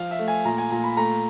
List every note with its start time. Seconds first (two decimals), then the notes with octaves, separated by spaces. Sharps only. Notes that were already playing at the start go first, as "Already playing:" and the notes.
Already playing: F3 F5
0.11 E5
0.19 A3
0.28 G#5
0.45 A#2 A#5
0.58 G#5
0.71 A#2 A#5
0.84 B5
0.97 A3 A#5